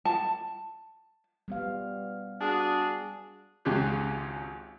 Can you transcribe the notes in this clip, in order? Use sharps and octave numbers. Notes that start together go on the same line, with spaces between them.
A5
G3 B3 F5
D4 F#4 G#4
G#1 C#2 C#3 C#4 G4 F#6